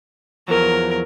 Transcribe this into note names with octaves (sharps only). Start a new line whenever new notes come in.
E2 F3 F#3 A#4